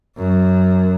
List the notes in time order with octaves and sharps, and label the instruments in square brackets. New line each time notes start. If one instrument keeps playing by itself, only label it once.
[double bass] F#2